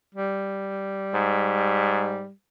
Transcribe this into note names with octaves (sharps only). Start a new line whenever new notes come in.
G3
G#2